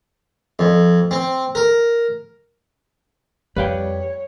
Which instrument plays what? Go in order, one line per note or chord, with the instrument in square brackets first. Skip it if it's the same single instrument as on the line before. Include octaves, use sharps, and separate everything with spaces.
[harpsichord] F2
C4
A#4
[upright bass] F2 [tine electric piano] G3 [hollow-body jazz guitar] B4 F5 G5 [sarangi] C#5